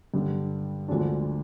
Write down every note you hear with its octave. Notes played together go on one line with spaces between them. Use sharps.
G2 D3 G3
D2 D3 F3 G#3 D4